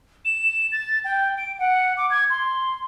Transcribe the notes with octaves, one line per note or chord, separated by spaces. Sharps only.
E7
A6
G5
D7
F#5
D6
G#6
C6